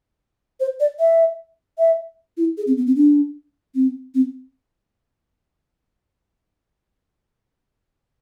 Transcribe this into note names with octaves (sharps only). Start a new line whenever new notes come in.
C5
D5
E5
E5
E4
G#4
C4
B3
C4
D4
C4
C4